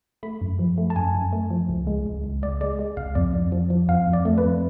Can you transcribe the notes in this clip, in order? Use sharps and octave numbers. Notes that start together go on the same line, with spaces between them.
A3 B5
F#2
F3
A3
A5
F#2 G#5
F#2
A3
F3
C#2
G#3
C#2
C#2
C#2 D5
G#3 D5
G#3
C#2 F5
F2 D5
F2
F3
F3
F2 F5
F2
D5
A3
B4
F2